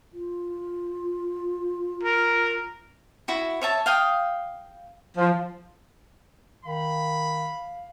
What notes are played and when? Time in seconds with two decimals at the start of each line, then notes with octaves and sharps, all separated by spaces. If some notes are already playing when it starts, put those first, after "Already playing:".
0.13 F4
2.03 A#4
3.28 E4 F#4
3.61 C#5 E5 A5
3.86 F5 G5 D#6
5.17 F3
6.65 D#3 F5 B5